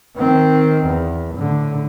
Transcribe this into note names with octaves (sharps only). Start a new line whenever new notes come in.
D#3 C4
E2
A2 D3